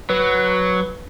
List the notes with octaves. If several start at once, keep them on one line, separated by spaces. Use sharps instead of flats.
F#3 B4